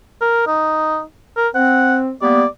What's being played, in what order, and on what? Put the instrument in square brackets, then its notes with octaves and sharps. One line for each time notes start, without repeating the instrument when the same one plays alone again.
[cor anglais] A#4
D#4
A#4
[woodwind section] C4 [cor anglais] F#5
[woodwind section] G3 A#3 B3 [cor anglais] D5